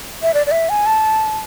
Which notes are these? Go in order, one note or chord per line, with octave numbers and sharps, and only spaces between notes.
E5
D5
D5
E5
G#5
A5